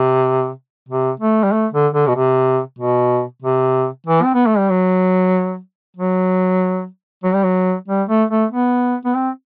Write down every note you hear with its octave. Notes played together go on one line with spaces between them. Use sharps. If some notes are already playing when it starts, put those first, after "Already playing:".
Already playing: C3
C3
A3
G3
A3
D3
D3
B2
C3
B2
C3
E3
C4
B3
A3
G3
F#3
F#3
F#3
G3
F#3
G3
A3
A3
B3
B3
C4